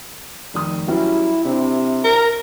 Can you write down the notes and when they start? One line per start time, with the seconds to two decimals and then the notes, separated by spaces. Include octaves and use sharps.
0.54 F1 D#3 D#6
0.88 F#3 G3 C#4 E4
1.45 C3 D4 E4
2.04 A#4